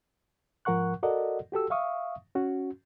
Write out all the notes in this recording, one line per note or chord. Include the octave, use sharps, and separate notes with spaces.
G#2 F3 A#4 F#5 C#6 F#6
F#4 A4 A#4 D5 D#5 F#5
F#4 G4 A4 E6
E5 F5 C#6 D#6
C#4 F#4